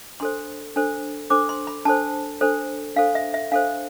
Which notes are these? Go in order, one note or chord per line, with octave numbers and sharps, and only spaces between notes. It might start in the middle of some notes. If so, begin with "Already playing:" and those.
D4 A4 C5 C6
D4 A4 C5
D4 A4 C5 D6
C6
B5
D4 A4 C5 A5
D4 A4 C5
D4 A4 C5 F5
E5
E5
D4 A4 C5 F5